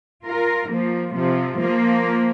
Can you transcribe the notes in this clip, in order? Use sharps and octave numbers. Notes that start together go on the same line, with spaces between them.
F4 A#4
F3 A#3
C3 F3
F3 A#3